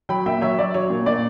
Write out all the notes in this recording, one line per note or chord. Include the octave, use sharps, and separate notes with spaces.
F#3 G5 B5
A#2 E5 G5
F#3 C#5 E5
F#3 D5
F#3 C#5
A#2
A#2 D5